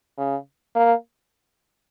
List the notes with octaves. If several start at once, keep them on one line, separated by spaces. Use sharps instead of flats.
C#3
A#3